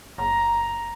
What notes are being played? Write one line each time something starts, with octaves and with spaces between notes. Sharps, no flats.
F#1 A#5